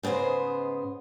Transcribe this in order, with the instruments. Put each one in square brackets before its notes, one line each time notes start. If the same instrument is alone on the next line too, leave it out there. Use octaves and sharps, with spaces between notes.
[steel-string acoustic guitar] G#2 C#3 G#3 B3 C5